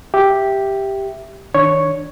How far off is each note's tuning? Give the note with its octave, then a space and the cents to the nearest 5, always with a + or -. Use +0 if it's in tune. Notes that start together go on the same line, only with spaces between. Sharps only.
G4 +0 E5 +5
D#3 +30 D4 +0 C#5 +0